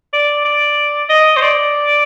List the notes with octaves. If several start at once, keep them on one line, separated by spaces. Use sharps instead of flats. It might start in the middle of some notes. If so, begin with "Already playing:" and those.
D5
D5
D#5
C5
D5